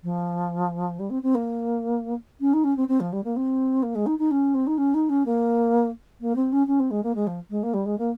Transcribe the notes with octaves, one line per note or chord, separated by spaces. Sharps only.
F3
G3
C4
C4
A#3
C#4
D#4
C#4
C4
C4
F3
G3
A#3
C4
A#3
G#3
D#4
D#4
C#4
C4
D#4
C#4
D#4
C#4
A#3
A#3
C4
C#4
C#4
C4
G#3
A#3
G#3
F3
G#3
A#3
G3
G#3
A#3